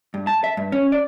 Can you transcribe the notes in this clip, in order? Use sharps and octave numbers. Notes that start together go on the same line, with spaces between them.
G2
A5
E5
G2
C#4
D5